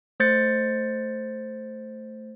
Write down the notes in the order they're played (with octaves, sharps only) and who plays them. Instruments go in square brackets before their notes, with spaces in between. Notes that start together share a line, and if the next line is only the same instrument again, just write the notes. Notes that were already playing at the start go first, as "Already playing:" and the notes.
[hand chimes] A3 C5 G6 A6 C#7